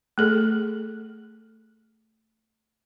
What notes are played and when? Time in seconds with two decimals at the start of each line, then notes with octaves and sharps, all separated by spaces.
0.18 A3 G#4 A4